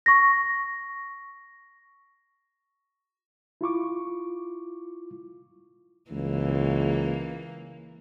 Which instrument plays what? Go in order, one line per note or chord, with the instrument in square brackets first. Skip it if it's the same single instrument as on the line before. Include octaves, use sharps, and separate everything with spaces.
[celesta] C#6 A#6
[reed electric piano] E4 F4 C#6 D6
[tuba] C#2 [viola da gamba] E3 A#3